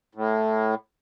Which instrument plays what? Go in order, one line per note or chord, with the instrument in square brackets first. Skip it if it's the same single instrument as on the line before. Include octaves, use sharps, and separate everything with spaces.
[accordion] A2